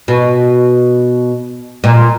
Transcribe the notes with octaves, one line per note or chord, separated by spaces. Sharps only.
B2
A#2